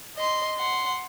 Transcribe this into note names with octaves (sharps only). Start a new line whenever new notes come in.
D#5 C6
F#5 C6